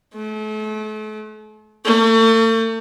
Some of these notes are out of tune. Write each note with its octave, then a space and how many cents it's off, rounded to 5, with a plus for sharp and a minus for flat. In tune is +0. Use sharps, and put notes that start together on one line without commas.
A3 -40
A3 +40